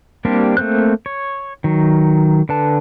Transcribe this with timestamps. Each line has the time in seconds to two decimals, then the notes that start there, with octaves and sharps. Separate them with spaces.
0.25 G3 A#3 C4 D4 G4
0.57 A3 A#3 C4 C5 F#6
1.06 C#5
1.64 D#3 F#3
2.49 D3 B4 A5